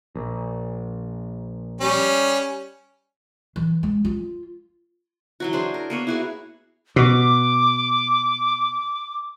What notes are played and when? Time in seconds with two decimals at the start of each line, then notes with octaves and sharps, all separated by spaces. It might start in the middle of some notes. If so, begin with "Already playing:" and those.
0.15 A#1
1.81 G3 C#4
3.56 E3
3.83 G#3
4.05 F4
5.40 E3 F#3 F#4
5.53 D4 G#4 C5
5.74 A#4
5.90 A#3 B3 C#5
6.07 E4 F#4 G#4
6.96 B2 D6